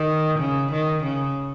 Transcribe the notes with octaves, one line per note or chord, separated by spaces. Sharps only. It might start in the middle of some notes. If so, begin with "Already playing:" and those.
Already playing: D#3
C#3
D#3
C#3